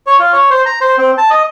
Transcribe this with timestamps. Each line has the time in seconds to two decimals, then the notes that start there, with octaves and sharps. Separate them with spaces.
0.07 C#5
0.19 F4
0.33 C#5
0.50 C5
0.66 A#5
0.81 C5
0.98 C4
1.18 A5
1.30 D#5